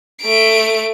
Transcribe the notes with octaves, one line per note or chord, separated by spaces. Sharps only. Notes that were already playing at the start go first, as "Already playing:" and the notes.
A3 D7